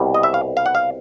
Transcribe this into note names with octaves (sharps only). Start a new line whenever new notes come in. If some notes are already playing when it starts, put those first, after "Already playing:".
Already playing: C2 B2 G3
D#5
E5
F5
F5
F#5
F5